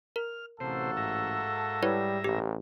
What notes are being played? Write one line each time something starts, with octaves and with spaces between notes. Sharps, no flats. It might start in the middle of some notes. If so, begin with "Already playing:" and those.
A#4 F6
A1 C3 A#3 F#4 A4 C5
G#2 E5 A#5
G3 E4 B4 C#5
A1 G4